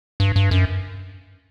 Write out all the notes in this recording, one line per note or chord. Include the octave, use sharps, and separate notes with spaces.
G2
G2
F#2